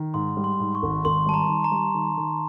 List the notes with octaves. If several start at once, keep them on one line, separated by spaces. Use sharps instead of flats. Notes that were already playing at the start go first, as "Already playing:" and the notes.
Already playing: D#3
G#2 C6
G3
C6
G#2
C#6
G#1
G#1 C6
G3 A5
A#5
D#3
A#5
G3
D#3
D#3